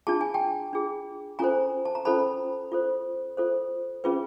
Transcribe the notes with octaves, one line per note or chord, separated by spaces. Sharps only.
D4 F4 G#4 A5
G#5
G5 A5
D4 F4 G#4
C#4 F4 A4 C5 G#5 A#5
A5
A#5
C#4 F4 A4 C5 A5 B5
F4 A4 C5
F4 A4 C5
C#4 F4 G#4 B4